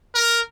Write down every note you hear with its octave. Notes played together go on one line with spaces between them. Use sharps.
A#4